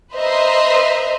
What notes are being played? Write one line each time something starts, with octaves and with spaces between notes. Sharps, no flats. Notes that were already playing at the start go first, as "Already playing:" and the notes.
B4 C5 D#5 E5 A#5 C6